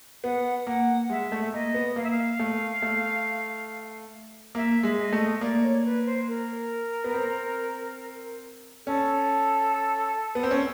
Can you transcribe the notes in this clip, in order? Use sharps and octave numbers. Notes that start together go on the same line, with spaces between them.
B3 F#5
A#3 F#5
G#3 E5
A3
A#3 D#5
B3
A#3 F5
E5
F5
A3
A3
A#3 E5
G#3
D#5
A3
A#3 D5
C#5
B4
C5
A#4
B3
C4
C#4 A4
B3
C4
C#4